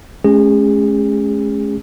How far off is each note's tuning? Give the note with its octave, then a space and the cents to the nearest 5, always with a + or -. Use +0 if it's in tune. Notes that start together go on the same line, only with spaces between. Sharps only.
G#3 +45 C#4 +0 G#4 -35